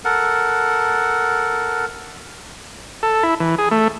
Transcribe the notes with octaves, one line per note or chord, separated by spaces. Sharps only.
A4 A#4 F#5
A4
E4
E3
G#4
A3